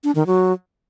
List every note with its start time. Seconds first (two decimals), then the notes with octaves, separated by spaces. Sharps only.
0.04 D4
0.15 D#3
0.27 F#3